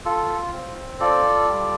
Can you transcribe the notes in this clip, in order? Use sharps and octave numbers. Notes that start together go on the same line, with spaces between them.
F4 A4
C4
F4 A4 D5
G3